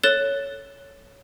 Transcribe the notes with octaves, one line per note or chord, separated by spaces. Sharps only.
A4 C#5 F#6 A6 E7 G7